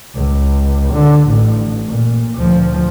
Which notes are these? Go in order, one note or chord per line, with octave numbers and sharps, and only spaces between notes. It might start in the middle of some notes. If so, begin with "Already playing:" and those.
C#2
D3
A1
A#2
D2 F3